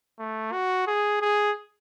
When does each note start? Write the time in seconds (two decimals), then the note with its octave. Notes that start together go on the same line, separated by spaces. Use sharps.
0.19 A3
0.52 F#4
0.87 G#4
1.21 G#4